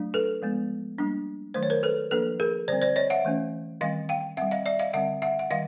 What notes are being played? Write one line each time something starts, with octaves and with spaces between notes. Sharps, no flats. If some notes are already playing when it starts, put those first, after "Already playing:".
Already playing: F#3 A3 D4
A4 B4
F3 G#3 B3
G3 A#3 D4
D#3 F#3 A3 C5
C#5
A#4 C5
A4 B4
F3 A#3 D4 A4 B4
G#4 A#4
D3 G3 C4 C5 D5
C5 D5
C#5 D#5
E5 F#5
E3 A3 C#4
D#3 G3 C4 D#5 F5
F5 G5
G3 C4 E5 F#5
D#5 F5
D5 E5
D#5 F5
D3 G3 C4 E5 F#5
E5 F#5
F#5
D#3 G3 D#5 F5